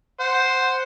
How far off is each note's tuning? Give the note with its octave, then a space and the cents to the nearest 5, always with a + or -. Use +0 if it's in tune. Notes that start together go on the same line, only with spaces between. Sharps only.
C5 +0 F#5 +0